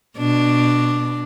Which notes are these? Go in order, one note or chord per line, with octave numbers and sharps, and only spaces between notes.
B2 D4